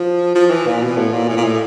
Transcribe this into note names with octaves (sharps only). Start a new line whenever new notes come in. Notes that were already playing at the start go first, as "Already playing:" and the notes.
Already playing: F3
F3
E3
A#2
B2
A2
A#2
A2
A#2
A2